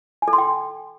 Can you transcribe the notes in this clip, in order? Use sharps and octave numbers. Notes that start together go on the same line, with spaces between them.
G#5
A4
C6
G5